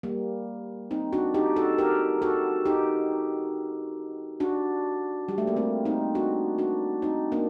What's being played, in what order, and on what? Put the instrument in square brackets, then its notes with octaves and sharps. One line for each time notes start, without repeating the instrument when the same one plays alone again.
[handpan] G3 A#3
C4 D#4
D4 F#4
D#4 G4
F#4 A4
G4 A#4
F#4 A4
D#4 G4
D4 F#4
G3
A3
A#3
A3 C4
C4 D#4
D4 F#4
D4 F#4
C4 D#4
A#3 D4